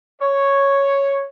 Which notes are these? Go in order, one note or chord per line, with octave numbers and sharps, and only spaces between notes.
C#5